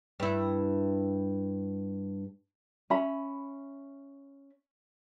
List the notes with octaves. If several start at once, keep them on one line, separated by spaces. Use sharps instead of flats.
G2 E4
C#4 E5 B5